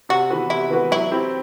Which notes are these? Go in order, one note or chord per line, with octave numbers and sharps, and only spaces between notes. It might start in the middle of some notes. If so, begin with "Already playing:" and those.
C3 F#4
E3 B3 F#4 B4
C3 E4
E3 B3 F#4 B4
F#3 E4
C4 E4 G4